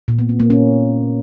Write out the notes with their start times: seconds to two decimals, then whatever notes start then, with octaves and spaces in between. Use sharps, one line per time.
0.08 A#2
0.19 B3
0.29 C4
0.40 A#3
0.50 C#4